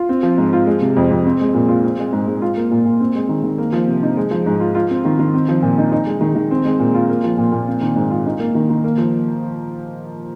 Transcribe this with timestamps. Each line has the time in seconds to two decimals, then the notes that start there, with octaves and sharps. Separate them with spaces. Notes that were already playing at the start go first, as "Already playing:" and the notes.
Already playing: F4
0.09 C4
0.23 F3
0.38 G#2
0.53 F4
0.67 G#3
0.81 C3
0.97 F2
1.11 F2
1.26 C4
1.40 G#3
1.54 A#2
1.68 F4
1.84 C4
1.99 G#3
2.13 G#2
2.27 G#2
2.42 F4
2.57 A#3
2.71 A#2
2.85 A#2
3.00 C4
3.15 G#3
3.29 D#3
3.43 D#3
3.58 A#3
3.73 F3
3.88 C3
4.03 D#4
4.17 G#3
4.31 F3
4.46 G#2
4.60 F4
4.75 F4
4.90 C4
5.05 D#3
5.19 D#3
5.34 C4
5.49 F3
5.62 A#2
5.78 D#4
5.92 D#4
6.07 G#3
6.21 D#3
6.35 D#3
6.51 C4
6.65 G#3
6.79 A#2
6.94 F4
7.09 A#3
7.24 F3
7.38 A#2
7.52 A#2
7.68 C4
7.81 D#3
7.96 G#2
8.10 F4
8.26 D#4
8.39 A#3
8.55 D#3
8.70 D#3
8.84 A#3
8.98 F3